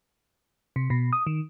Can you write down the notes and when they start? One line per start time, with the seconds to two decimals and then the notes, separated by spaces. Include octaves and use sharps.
0.76 C3
0.90 B2
1.13 D#6
1.27 D#3